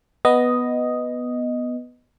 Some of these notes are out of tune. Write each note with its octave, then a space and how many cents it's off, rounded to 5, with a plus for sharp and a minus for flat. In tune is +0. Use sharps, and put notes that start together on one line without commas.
B3 +0 D#5 +0